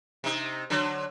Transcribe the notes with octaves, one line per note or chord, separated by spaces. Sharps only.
C3 D#4
D3 F#3